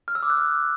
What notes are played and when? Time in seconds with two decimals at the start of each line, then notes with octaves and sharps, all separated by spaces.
0.08 F6
0.15 E6
0.23 D6
0.30 F#6
0.37 F6